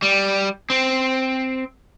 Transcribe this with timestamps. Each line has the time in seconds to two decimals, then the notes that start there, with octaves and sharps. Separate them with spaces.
0.02 G3
0.70 C4